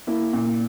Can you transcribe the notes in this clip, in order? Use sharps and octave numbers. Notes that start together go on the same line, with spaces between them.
A#3 E4
A#2